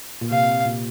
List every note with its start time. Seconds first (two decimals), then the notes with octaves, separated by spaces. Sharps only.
0.21 A#2
0.31 C3 F5
0.66 A#2